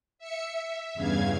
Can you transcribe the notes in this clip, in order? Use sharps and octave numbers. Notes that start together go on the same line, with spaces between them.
E5 C#7
E5
E2 G2 C#3 F5 G#6